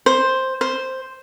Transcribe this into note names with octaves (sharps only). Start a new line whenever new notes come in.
C5
C5